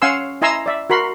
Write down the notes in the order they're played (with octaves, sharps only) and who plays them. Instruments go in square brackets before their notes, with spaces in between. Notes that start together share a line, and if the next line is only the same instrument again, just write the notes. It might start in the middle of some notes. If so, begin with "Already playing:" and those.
[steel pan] C#4 F5 F#5 G#5 C6 E6
E4 D#5 G#5 A#5 C6 E6
D5 E5
F#4 A#4 B5 C6